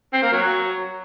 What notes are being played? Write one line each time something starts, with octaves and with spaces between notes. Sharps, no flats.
C4
A#3
F#3